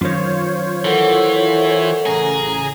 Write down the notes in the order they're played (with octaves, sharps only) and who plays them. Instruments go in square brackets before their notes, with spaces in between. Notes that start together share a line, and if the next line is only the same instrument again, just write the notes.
[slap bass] F#2 D#3 [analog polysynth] F4 C5 C#5
[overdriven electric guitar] E3 [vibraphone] A4 A#4 F#5
[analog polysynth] A1 C#3 A#5 [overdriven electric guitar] G#4